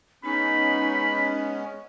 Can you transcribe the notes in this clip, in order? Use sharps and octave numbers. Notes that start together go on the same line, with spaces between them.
G#3 B3 C#4 D#4 B5